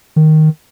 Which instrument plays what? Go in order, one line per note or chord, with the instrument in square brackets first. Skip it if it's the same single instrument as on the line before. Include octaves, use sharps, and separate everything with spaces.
[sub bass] D#3